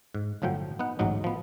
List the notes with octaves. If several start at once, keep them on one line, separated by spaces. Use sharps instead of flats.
G#2
G1 A2 F3 F#3 G5
B3 D#4 F#5
A1 D2 G#2 F#3 D#4
F3 B3